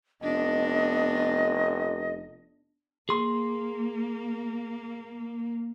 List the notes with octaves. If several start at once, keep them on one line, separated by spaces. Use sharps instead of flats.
F1 B3 D4 D#5
A#3 G#4 C6